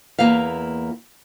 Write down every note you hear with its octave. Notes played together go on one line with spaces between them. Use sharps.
E2 A#3 E4 B4 F5